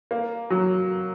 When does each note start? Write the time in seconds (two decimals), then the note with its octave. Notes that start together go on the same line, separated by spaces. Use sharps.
0.11 A#3
0.50 F#3